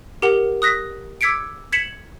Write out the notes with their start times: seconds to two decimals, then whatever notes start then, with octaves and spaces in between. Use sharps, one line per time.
0.22 G4 A#4 F#5 F7
0.62 D#6 F#6 A#6 B6
1.21 D6 E6 G#6 B6 C#7 D7
1.72 G#6 B6 C#7 E7 F#7